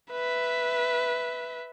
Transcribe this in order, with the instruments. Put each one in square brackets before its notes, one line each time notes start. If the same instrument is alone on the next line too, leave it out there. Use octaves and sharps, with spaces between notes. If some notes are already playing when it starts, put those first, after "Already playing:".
[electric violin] B4 E5